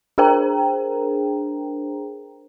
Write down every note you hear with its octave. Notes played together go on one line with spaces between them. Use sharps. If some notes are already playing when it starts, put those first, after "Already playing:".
D4 G#4 A#4 C5 G5 A#5